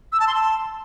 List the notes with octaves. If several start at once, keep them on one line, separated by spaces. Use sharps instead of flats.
E6
A5
C6
A5